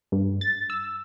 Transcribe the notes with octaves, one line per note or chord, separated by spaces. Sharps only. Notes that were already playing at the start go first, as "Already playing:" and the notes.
G2
A6
E6